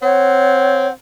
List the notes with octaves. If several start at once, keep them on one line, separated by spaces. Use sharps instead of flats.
C4 C#5 F#5